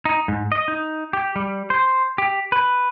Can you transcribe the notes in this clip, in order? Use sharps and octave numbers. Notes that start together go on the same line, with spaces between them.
D#4
G#2
D#5
D#4
G4
G3
C5
G4
B4